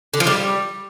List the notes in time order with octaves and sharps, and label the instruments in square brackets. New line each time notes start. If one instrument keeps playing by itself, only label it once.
[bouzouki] D3
F3
G3